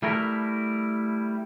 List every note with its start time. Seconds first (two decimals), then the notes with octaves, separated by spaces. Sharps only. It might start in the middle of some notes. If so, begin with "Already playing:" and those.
0.03 G3 A3 E4 A#4